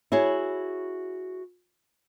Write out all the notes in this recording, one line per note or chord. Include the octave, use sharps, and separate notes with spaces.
E4 F#4 G#4 C#5